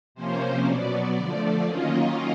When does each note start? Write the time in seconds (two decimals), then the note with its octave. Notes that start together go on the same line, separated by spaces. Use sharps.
0.15 C3 F3 A#3 C#4 C5
0.65 B2 F#3 B3 D5
1.16 D3 F3 A3
1.66 D#3 F#3 A#3 C#4 F4 D#5